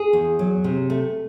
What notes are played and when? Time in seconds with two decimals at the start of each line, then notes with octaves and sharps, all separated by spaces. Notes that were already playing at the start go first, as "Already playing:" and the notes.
Already playing: G#4
0.13 E2
0.39 F#3
0.64 C3
0.90 A3